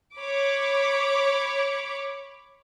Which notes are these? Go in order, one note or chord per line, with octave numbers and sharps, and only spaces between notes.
C#5 B5 D6